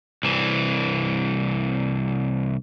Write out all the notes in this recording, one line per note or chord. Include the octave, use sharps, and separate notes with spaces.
C2 E3